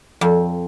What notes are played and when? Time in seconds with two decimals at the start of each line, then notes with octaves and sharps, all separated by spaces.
0.21 F2